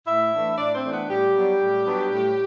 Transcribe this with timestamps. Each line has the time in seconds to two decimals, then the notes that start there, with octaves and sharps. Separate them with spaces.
0.07 A2 E4 E5
0.33 E3 A3 D4
0.58 A2 D4 D5
0.75 C4 C5
0.83 E3 A3 D4
0.92 B3 B4
1.09 A2 G3 G4
1.34 F#3 B3 D4
1.60 A2
1.85 F#3 B3 D4
2.11 A2